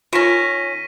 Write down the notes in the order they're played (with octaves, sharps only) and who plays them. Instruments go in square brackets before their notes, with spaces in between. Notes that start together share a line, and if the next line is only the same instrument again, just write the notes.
[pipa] D#3 C#4 [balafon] F4 [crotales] A#6 B6 D#7